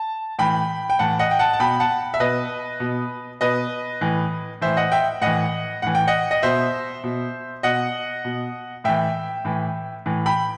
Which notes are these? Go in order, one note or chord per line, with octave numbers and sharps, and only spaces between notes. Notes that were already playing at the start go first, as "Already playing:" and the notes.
Already playing: A5
A2 E3 G5 B5
G5
A2 E3 F#5 A5
D#5 F#5
G5
F#5 A5
A5
B2 G5 B5
F#5 A5
E5
B2 B4 D#5
B2
B2 B4 D#5
A2 E3
A2 E3 C5 E5
D#5 F#5
E5 G5
A2 E3 D#5 F#5
A2 E3 F#5
G5
D#5 F#5
D#5
B2 C5 E5
B2
B2 D#5 F#5
B2
A2 E3 E5 G5
A2 E3
A2 E3
G5 B5